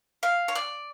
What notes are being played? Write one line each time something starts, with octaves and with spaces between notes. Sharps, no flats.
F5
C#5
D5